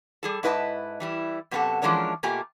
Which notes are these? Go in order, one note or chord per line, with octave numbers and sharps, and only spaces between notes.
G3 G#4 A4
G#2 E4 B4 D#5 G#5 A5
E3 G3 E4
F#2 C3 B3 C4 F#4 A4
E3 F3 G#3 C#4 D4 A#4
B2 A3 A#3 F4 G4 G#5